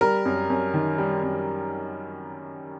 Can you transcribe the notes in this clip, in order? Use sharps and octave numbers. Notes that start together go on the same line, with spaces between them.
G3 A#4
F#2
F#2
D#3
G3
F#2